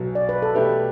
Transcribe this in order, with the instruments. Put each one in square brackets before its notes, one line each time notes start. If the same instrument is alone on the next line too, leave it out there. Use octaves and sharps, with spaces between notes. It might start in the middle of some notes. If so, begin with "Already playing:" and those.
Already playing: [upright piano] B1 B2 F#3
[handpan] D5
B4
A4
[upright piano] B2 A3 E4 G4 [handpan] B4